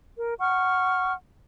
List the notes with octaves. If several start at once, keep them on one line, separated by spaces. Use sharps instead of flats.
A#4
F#5 C#6 F6